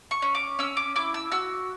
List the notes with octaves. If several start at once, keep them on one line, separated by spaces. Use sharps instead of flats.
C#6
C#4
D6
C#4 E6
D6
E4 D6
E6
F#4 E6